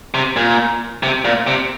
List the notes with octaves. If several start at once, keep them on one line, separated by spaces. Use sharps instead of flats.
C3
A#2
C3
A#2
C3